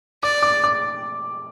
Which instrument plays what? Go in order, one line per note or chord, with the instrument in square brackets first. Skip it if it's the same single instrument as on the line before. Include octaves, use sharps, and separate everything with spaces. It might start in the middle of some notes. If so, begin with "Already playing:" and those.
[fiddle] D5 [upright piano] D6
[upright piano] D6
D6